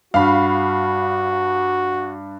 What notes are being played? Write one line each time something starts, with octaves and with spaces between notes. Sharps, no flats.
G2 F#4 F5 B5